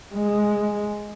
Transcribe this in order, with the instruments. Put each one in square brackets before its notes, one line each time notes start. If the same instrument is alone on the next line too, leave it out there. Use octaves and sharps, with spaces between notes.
[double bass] G#3